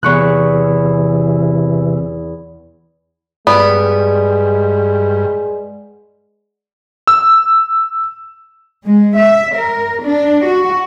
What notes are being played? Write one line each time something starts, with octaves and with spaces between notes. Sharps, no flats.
E2 C3 E3 C#6 F#6
G2 G#3 B3 D5
E6
G#3
E5
A#4
D4
F#4